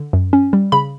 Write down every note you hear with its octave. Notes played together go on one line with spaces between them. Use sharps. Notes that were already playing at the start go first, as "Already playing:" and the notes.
Already playing: D3
F#2
C#4
G3
C#3 B5